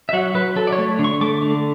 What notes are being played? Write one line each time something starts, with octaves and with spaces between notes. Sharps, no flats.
E5
F#3 F#5
F#3 B4
F#3 A4
D5
C#5
A3
D3
C#6
A3 D6
D3